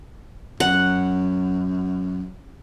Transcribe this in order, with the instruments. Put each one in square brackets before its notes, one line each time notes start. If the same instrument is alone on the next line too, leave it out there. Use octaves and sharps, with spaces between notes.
[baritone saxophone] F#2 [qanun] F#5